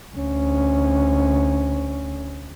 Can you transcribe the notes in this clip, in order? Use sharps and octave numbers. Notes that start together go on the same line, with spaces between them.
D2 C#4